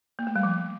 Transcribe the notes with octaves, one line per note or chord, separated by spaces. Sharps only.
A#3
A3
G3
F3